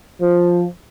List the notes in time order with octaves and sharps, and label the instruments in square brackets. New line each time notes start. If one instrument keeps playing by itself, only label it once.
[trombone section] F3